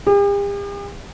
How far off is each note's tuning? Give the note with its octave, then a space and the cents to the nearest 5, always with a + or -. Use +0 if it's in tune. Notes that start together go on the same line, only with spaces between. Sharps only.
G4 +45